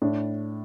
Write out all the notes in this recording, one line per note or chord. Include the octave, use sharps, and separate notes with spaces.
A2 D4